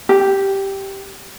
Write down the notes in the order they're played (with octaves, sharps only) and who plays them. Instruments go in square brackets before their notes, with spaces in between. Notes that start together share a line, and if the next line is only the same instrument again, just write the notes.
[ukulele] G4